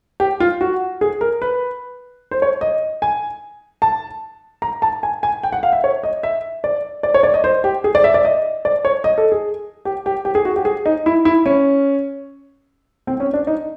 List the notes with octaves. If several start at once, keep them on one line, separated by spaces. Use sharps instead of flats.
G4
F4
F#4
G#4
A#4
B4
C5
C#5
D#5
G#5
A5
A#5
A5
G#5
G#5
G5
F#5
F5
E5
C#5
D#5
E5
D5
D5
C#5
D5
D#5
C5
G4
G#4
D5
E5
D5
D#5
D5
C#5
D#5
A4
G#4
G4
G4
G4
G#4
F#4
G4
G#4
D#4
E4
E4
C#4
C4
C#4
D4
D#4